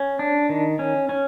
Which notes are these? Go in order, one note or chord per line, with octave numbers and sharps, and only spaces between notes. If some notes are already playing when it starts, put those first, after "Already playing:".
Already playing: C#4
D4
D#3
C#4
C#4